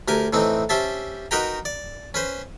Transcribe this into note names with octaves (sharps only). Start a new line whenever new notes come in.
D2 G4 A#4 G#5
A2 E3 C4 D#4
C#4 G4 C5 E5 A5
D#4 F#4 A#4 B4 G5 A#5
D5
C#4 B4 C5